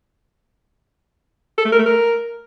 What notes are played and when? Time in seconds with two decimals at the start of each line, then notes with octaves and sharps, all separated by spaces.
1.58 A4
1.65 A3
1.72 A#4
1.79 A3
1.86 A#4